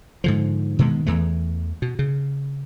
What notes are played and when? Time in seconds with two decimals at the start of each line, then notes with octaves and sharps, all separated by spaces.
0.24 G#2 D3 F3
0.79 B2 D#3 G#3 B3
1.06 E2 E3 A3
1.82 B2
1.99 C#3